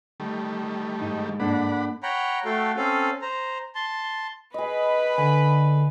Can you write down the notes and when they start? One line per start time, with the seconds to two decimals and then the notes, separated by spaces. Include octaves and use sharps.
0.20 D#3 G3 A3
1.01 G#2 D#4
1.40 A#3 D4 A4 D5 F#5 B5
2.03 C#5 F#5 G5 A#5 B5
2.45 A3 F#4 A4 F5 G5
2.76 C4 C#4 A4 F5
3.22 C5 A#5
3.75 A5 C6
4.54 G#4 B4 D#5 B5
5.18 D3 G#5